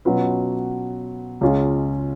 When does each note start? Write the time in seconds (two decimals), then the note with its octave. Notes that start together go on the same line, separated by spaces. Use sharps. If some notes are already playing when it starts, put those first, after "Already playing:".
0.05 B2 F#3 C#4 F4 B4
1.41 C#2 C#3 G#3 C#4 F4